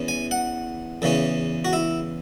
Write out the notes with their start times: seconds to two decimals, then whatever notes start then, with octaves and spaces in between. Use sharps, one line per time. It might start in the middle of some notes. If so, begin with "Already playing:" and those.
Already playing: E2 E3 C#4
0.08 G#5
0.31 F#5
1.02 E2 C#3 E3 C#4
1.65 F#4
1.73 E4